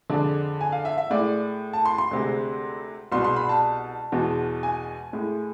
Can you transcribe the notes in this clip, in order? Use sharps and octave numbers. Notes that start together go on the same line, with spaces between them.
F2 D3 G#3 D5
G#5
F5
E5
E5
A2 G#3 D5
A5
C6
C6
D2 C3 G#3
C2 B2 G#3 C6
C6
B5
A5
E2 B2 G#3
G#5
A2 G#3